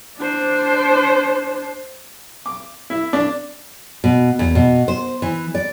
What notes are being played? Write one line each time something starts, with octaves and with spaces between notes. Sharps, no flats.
D4 C5
D6
E4
D4
B2
E2
B2
C5
E3
D5